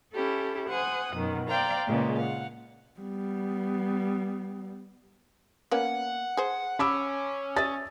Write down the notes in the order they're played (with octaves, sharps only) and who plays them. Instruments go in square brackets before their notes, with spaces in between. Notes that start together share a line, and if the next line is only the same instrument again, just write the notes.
[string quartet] C#4 E4 G4 A4
C5 F#5 G#5 D#6
F#2 B2 D#3
C5 D5 F5 G5 A#5
A#2 C#3 G#3 A#3 B3
F5 F#5
[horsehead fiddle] G3 B3
[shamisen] A#3 B3 C#4 [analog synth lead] F#5
[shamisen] G#4 C5
[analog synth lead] C#4 [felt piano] B5 D6 E6
[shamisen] D5 E5 [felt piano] D#6 A6